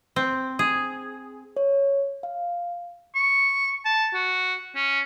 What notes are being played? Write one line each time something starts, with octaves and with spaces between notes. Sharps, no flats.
C4
G#4
C#5
F5
C#6
A5
F#4
C#4